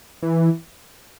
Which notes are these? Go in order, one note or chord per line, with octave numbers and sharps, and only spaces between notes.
E3